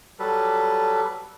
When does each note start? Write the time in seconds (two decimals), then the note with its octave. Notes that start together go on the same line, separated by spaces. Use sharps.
0.19 F#3 G3 A4 B4